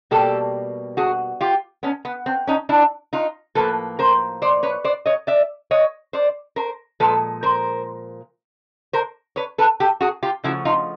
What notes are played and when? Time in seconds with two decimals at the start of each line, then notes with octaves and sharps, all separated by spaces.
0.11 B2 G3 A#3 G4 A4
0.97 F#4 G#4
1.41 F4 G4
1.83 B3 C#4
2.05 B3
2.26 C4
2.47 C#4 D#4
2.69 D4 E4
3.13 D#4 F4
3.55 A2 F3 A#3 A4 B4
3.99 A#4 C5
4.42 C5 D5
4.63 B4 C#5
4.84 C5 D5
5.06 C#5 D#5
5.27 D5 E5
5.71 C#5 D#5
6.13 C5 D5
6.56 A#4 C5
7.00 A#2 F3 G#3 A4 B4
7.43 A#4 C5
8.93 A#4 C5
9.36 B4 C#5
9.58 A4 B4
9.80 G4 A4
10.01 F#4 G#4
10.23 F4 G4
10.44 C#3 F3 A3 E4 F#4
10.65 D#4 F4